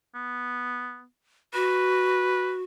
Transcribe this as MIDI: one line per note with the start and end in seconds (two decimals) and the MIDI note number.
0.15 1.04 59
1.54 2.63 66
1.54 2.55 71